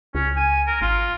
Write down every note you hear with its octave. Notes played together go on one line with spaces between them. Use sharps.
C#2 C#4
G#5
A#4
G#1 F4